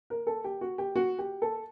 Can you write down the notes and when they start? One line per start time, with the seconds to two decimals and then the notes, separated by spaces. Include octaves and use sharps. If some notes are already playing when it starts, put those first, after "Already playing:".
0.10 A#4
0.27 A4
0.44 G4
0.61 F#4
0.78 G4
0.96 F#4
1.19 G4
1.42 A4